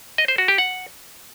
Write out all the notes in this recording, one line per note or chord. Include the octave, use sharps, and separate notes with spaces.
D#5
C5
F#4
G4
F#5